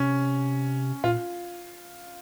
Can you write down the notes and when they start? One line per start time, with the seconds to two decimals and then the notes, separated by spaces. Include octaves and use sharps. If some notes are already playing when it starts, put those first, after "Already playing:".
Already playing: C3 C#4
1.04 A#2 F4